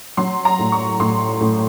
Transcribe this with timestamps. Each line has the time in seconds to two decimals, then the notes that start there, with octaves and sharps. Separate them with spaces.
0.17 F#3 C6
0.45 A#5
0.59 A2
0.72 C#6
1.00 A2 C6
1.40 A2